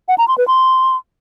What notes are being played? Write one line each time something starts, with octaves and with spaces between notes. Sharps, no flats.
F#5
A#5
C6
B4
C6